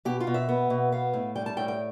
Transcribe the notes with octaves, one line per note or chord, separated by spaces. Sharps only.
B2 G4
F4
B2
E5
B3
B2
B3 F5
A2
G3 G5
A5
A2 G5
G5